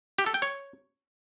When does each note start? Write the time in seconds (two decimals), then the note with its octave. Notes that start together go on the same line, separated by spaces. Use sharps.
0.18 G4
0.26 A4
0.34 G5
0.42 C#5